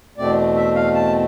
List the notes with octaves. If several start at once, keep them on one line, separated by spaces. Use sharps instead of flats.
E2 B2 A3 C4 D5
E5
F5
A5